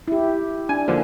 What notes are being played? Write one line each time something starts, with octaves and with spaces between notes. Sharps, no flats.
E4 G4
D4 G#5
D3 F3 A#3